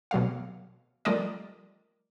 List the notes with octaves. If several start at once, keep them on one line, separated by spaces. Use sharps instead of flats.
B2 F#3 A3 F5
F3 G3 A3 A#4 D5 D#5